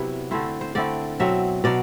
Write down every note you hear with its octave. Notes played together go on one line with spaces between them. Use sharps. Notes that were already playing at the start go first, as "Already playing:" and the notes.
Already playing: C3 F#3 B3 E4
D3 A3 C4 E4 C5
C5
D3 A3 C4 E4 D5
B2 F#3 C4 E5
B2 F#3 D5